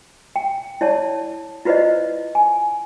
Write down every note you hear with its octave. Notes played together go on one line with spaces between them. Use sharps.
G5
E4 C#5 D5 A5
E4 F4 B4 C5 D5 D#5
G#5